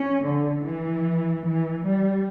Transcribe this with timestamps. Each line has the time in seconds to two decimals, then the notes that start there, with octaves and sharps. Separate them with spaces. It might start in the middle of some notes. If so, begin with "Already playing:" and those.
Already playing: C#4
0.24 D3
0.64 E3
1.44 E3
1.85 G3